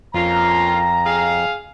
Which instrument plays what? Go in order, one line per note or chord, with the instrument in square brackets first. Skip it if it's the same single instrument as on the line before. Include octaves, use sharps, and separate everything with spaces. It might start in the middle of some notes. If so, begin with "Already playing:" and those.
[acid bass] F2 [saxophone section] A#3 C#4 F4 [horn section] A#5
[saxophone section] G#4 F5